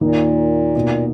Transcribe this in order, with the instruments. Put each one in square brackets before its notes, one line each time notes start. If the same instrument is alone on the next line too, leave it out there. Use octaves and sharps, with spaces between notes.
[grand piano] D#2 D#3 A#3 D#4 [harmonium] A#2
[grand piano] B2 A#3 D#4